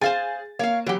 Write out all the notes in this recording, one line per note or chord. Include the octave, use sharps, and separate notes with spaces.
G#4 C5 F5 G#5 A6
A#3 C#5 F5
E3 F#3 G4 F#5